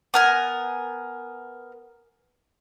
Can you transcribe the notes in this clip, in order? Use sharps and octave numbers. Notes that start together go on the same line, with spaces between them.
B3 A#4 G#5